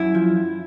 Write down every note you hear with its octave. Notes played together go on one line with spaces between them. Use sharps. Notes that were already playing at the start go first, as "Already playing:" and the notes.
Already playing: F#2 E4
F3